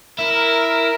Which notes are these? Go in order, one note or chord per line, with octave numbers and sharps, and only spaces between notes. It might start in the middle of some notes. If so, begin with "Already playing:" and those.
E4 A#4